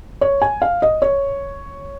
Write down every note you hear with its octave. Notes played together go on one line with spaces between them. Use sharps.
C#5
G#5
F5
D#5
C#5